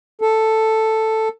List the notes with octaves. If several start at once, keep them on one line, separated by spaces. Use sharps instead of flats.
A4